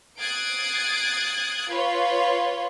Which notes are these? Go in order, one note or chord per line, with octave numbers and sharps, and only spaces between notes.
D#6 F#6 G#6 A6 C7 D7
F4 B4 C#5